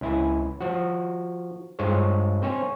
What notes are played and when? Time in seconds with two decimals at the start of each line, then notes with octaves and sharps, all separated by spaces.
0.01 C#2 E4 G#5
0.61 F3 F#4
1.79 G2 G#3 F4 C5 C#5
2.42 C4 C5 C#5 G#5